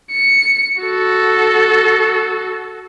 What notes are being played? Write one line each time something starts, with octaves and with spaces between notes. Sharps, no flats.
C#7
F#4 A4